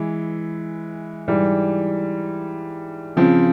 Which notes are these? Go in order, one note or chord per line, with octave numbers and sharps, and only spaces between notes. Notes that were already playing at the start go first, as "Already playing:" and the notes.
Already playing: E3 G#3 E4
G#2 E3 G3
C#3 F3 C4